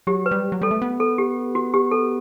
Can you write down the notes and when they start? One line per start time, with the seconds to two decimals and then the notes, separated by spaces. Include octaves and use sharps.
0.07 F#3 G4
0.26 B4
0.31 G3
0.52 F#3
0.61 G3 A4
0.71 A3
0.82 B3
1.00 A4
1.18 G4
1.55 F#4
1.74 G4
1.91 A4